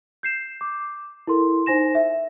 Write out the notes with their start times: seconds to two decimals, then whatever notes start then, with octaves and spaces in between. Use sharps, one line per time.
0.23 G6 C7 E7
0.61 D6
1.27 E4 A4 A#4 C6
1.66 D#4 C5 G#5 A#6 E7
1.95 E5